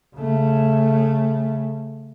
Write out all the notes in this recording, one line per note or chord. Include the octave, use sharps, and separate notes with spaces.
C#3 A3